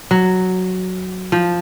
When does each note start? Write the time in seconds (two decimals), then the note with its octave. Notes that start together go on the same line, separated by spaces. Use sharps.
0.11 F#3
1.32 F3